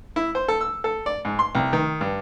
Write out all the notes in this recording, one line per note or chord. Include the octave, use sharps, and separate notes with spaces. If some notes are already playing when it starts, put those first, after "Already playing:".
E4
C5
A4
E6
A4
D5
G#2
C6
C2
D#3
G2